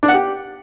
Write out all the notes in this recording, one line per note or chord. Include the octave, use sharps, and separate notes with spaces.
D4
F#5
G4